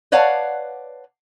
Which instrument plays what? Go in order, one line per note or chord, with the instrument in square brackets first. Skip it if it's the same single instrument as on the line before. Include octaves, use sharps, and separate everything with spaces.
[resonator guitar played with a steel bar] B4 C#5 D5 F5 F#5 A5